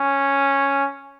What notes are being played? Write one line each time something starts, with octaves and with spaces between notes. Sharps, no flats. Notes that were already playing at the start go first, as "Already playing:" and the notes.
Already playing: C#4